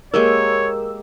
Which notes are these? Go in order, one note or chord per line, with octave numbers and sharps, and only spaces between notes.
G#3 A#3 G4 A#4 C#5 E6